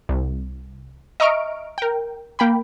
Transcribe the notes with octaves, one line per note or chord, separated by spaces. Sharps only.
C2
D#5 E5 A#5 C#6 F6 D7
A#4 G5
A#3 G5 B5